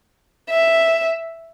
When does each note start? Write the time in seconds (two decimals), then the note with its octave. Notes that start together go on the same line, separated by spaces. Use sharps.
0.50 E5